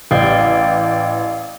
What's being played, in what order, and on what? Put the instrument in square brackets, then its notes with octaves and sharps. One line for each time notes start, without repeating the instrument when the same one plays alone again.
[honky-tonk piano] A1 [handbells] D5 F5 G5